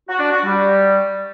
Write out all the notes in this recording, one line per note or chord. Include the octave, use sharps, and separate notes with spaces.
F#4
D4
F#4
G3